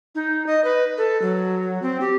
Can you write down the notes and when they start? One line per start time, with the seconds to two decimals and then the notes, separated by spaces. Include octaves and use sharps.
0.15 D#4
0.47 D#5
0.64 B4
0.98 A4
1.22 F#3
1.82 C4
2.01 G4